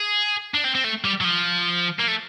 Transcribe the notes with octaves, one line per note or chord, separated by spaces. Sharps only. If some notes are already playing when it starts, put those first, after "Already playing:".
Already playing: G#4
D4
C4
C4
A3
G3
F#3
F3
A#3
A3